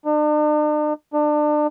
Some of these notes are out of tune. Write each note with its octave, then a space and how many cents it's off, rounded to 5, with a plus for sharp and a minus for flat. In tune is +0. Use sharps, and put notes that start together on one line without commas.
D4 +45
D4 +30